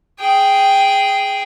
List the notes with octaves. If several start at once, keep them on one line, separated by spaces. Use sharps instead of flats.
G#4 G5